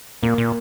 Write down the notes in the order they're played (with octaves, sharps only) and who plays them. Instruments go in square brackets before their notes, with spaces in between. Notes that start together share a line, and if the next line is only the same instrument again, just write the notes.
[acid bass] A#2 [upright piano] A#3
[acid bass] A#2